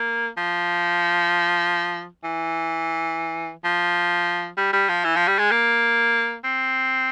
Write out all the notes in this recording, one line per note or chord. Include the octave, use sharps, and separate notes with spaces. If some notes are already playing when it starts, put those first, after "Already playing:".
Already playing: A#3
F3
E3
F3
G3
G3
F3
E3
F3
G3
G#3
A#3
C4